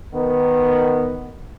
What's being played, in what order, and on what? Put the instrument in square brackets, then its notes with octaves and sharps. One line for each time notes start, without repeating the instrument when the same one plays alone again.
[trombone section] D#3 B3